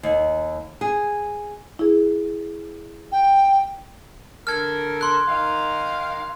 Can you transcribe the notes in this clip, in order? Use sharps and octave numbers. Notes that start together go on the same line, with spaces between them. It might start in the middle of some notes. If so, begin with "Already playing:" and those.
D#2
G#4
E4 G#4
G5
D3 A4 A#4 F6 G#6
C6 F#6
D#3 F5